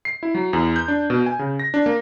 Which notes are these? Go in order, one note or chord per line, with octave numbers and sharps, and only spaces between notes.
C7
E4
F#3
E2
G6
D4
B2
G#5
C#3
A#6
D4
A#3